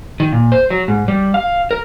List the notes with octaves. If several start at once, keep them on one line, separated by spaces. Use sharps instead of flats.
D#3
A#2
C5
F#3
G#2
G3
F5
A#4